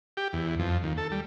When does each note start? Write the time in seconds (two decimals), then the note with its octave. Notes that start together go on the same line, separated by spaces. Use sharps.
0.17 G4
0.33 E2
0.59 F2
0.83 D#2
0.97 A4
1.12 G3